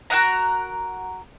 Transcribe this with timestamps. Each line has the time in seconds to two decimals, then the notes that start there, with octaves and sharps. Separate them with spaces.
0.10 F#4 A#4 F#5 A#5